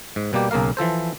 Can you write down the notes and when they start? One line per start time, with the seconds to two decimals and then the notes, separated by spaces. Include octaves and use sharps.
0.16 G#2
0.33 B2 G3 A#3 G4
0.51 B1 C#3 A#3 A#4 F5
0.77 E3 F3 A4 C5